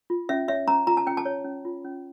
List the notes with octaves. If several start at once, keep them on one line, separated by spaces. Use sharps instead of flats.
F4
C#4 E5
C#5 E5
C#4 A#5
F4 A#5
A5
C#4 G5
A5
C#5
C#4
F4
C#4